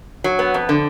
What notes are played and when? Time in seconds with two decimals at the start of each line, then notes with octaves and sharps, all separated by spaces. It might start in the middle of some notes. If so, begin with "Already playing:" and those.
0.24 F#3
0.39 B3
0.54 F2
0.69 D3